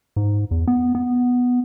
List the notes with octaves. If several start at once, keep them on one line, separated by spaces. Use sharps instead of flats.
G#2
E2
B3
B3